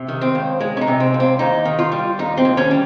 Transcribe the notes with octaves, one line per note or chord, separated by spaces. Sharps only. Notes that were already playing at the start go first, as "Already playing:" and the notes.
Already playing: C3
D#3
C4
C#2
G#3
C#4
D#4
C3
C4
C#2
C4
D#2 D#4
D#3
F4
G3
D#2 D#4
C4
D#2
C#4
G3